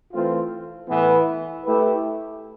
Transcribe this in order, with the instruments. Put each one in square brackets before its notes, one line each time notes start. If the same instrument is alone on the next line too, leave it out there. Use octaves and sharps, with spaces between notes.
[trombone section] E3 A3 C4 F4
A2 E3 B3
A3 E4 G4 B4